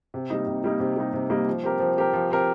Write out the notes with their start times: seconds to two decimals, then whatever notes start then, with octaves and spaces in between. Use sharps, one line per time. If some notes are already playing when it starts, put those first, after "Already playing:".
0.14 C3
0.30 G3 A#3 D#4
0.47 C3
0.64 G3 A#3 D#4
0.80 C3
0.97 G3 A#3 D#4
1.13 C3
1.30 G3 A#3 D#4
1.48 F3
1.64 C4 G4 A#4
1.80 F3
1.98 C4 G4 A#4
2.13 F3
2.31 C4 G4 A#4